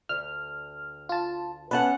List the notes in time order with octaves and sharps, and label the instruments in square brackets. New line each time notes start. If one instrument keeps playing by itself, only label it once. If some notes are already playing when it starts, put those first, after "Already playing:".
[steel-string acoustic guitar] D2 [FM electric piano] F6
[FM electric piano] F4 A5
[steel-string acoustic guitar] B3 C#4 F#5 [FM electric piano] B4 A5 F#6